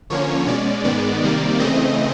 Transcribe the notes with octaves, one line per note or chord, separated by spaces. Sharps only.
D3 F3 A#3 C#4 C#5
B2 G#3 C#4 D5
G#2 D#3 G#3 B3 D5
C3 D#3 G3 A#3
C#3 E3 A3 C4 D#5